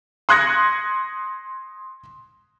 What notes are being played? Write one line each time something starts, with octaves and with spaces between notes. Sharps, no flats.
C6 D#6 F#6 G#6 A#6 C#7